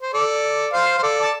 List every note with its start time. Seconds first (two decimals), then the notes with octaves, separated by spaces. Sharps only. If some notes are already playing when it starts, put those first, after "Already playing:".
0.02 C5
0.14 A4 D5
0.73 C5 F5
0.98 C5
1.03 A4 D5
1.22 A5